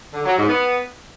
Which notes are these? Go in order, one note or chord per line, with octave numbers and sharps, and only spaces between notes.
D3
F#3
G#2
B3